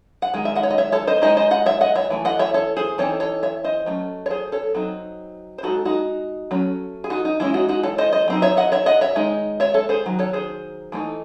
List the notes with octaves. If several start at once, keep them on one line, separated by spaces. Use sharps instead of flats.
F#5
D#3 G#3
E5
D#5 F#5
C#5
D#5
C#5 E5
A4 C#5
C5 D#5
G#3 D#4 C5 D#5
C5 D#5
D#5 F#5
C#5 E5
D#5 F#5
C#5 E5
E3 A3
D#5 F#5
C#5 E5
A4 C#5
G#4 C5
E3 C4 D#4 A4 C#5
A4 C#5
C#5 E5
C5 D#5
F#3 A3 C#4
C#5
G#4 C5
A4 C#5
F#3 C4 D#4
C5
G#3 D#4 F#4 A4
D#4 F#4
F#3 A3 C#4
G#4
D#4 F#4
D#4
E3 G#3 C#4 E4
D#4 F#4
D#4 F#4
A4 C#5
C5 D#5
C5 D#5
F#3 C4 D#4
C#5 E5
D#5 F#5
C#5 E5
D#5 F#5
C#5 E5
D#3 G#3 D#4
C#5 E5
A4 C#5
G#4 C5
D#3 F#3
A4 C#5
G#4 C5
E3 A3 C4 D#4